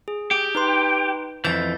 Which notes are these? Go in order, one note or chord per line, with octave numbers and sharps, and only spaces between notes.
G#4
G4
D#4 B4 C6
F2 E3 G6 A6